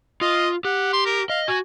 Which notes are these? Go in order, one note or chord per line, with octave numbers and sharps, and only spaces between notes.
F4 D#5
G4 F#5
C6
A#4
D#5 F5
F#4 G#5